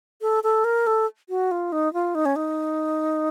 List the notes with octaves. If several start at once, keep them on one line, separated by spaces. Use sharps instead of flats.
A4
A4
A#4
A4
F#4
F4
D#4
F4
D#4
C#4
D#4